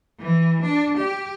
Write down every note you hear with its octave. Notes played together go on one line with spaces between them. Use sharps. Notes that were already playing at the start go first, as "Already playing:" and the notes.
E3
D4
G4